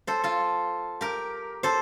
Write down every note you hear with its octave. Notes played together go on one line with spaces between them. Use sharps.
A4 C5
F4 A4
G4 A#4
A4 C5